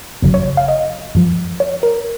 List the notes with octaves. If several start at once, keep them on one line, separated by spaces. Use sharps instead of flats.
G#1 F#2 C#3 F#3
C#5
F5
D#5
F#2 F3
C#5
A#4